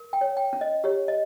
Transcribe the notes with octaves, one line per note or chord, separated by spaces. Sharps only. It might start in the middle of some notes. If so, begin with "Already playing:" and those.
Already playing: A#4
G5
C#5
G5
C#4
D#5
G4 C#5
D#5